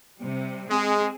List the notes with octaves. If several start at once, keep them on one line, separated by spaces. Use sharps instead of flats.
C3 G3
G#3 C4 G#4